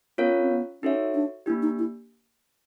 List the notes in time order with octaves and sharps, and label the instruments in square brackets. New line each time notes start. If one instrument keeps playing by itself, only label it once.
[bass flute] B3 [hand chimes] C#4 F4 A#4 C#5 F5
[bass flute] C4
B3
[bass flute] C#4 [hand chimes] D#4 F#4 A4 C#5 E5
[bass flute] D4
[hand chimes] A#3 D4 G4 [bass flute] E4
[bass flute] D#4
E4